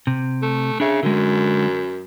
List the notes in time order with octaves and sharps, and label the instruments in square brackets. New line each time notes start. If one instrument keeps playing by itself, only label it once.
[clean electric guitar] C3
[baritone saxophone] A3
[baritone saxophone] C#3 [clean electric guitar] D4 E5
[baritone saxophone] F#2 [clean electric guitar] D3 G#3